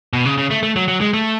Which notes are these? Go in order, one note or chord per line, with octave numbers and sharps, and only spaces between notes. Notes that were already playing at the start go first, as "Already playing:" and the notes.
B2
C#3
C#3
A3
A3
F#3
F#3
G#3
A3